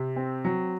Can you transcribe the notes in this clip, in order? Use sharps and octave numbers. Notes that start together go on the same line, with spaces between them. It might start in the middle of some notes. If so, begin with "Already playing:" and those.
Already playing: C3
C4
F#3